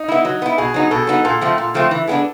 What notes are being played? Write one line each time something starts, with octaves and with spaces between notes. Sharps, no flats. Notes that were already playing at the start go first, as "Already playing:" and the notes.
Already playing: D#4
B3 E4
F#3
B3 E4
B2 G#4
F#3 B3 D#4
B2 A4
F#3 B3 D#4
A#2 A4
F3 A3 C4
A#2
F3 A3 C4
E3
G#3 B3 D4